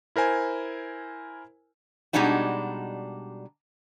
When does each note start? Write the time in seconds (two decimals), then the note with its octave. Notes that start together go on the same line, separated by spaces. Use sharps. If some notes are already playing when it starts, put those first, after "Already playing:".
0.16 E4 A#4 C5 G#5
2.13 B2 G3 G#3 D4 D#4 F#4